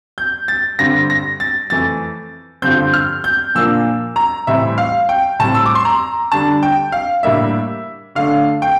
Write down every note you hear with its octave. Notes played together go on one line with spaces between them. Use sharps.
G6
A6
G2 D3 G3 C4 A#6
A#6
A6
F2 E3 A3 A6
G2 D3 F3 C4 G6
F6
G6
A#2 F3 A#3 D4 E6
A#5
A2 E3 G3 C4 E5
F5
G5
A2 G3 C4 A5
E6
D6
C6
A#5
D3 G3 D4 A5
G5
F5
A2 G3 A#3 D4 E5
D3 A3 D4 F5
G5